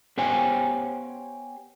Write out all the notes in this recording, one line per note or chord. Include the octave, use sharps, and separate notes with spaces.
B3 G4 C5 C#5 G5 G#5